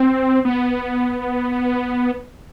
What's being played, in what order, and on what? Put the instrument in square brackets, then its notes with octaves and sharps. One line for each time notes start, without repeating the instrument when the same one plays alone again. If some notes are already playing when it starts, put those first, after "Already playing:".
Already playing: [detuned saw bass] C4
B3